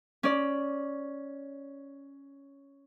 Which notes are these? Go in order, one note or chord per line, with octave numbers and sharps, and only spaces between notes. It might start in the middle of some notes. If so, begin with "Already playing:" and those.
C#4 D5